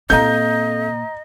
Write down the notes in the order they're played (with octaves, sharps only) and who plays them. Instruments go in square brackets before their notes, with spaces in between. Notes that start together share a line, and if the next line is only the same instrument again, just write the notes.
[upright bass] A#2 A#3 [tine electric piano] C4 A4 F5 [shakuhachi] D#5 [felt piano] A#5 G6